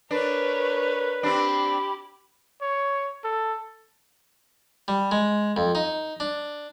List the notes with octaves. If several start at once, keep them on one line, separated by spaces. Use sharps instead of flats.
D4 A#4 B4 C#5
C4 D4 G4 B5
C#5
A4
G3
G#3
F2
D#4
D4